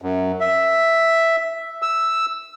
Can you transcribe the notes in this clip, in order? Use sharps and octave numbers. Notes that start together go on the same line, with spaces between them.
F#2
E5
E6